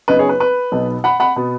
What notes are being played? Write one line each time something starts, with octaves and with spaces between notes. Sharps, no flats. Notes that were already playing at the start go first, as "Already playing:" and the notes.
F#2 C#3 B3 D#4 B4 D#5
G#4 C#5
B4
B4
B1 B2 B3 D#4
F#5 B5
F#5 B5
B2 B3